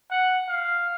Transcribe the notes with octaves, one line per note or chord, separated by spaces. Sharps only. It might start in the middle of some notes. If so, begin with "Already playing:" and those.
F#5
F5